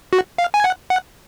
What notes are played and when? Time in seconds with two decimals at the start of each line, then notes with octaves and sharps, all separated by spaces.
0.13 F#4
0.38 F5
0.54 G#5
0.64 F#5
0.90 F#5